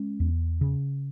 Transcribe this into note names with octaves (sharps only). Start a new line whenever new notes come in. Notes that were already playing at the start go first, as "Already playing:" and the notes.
Already playing: G#3 C#4
E2
C#3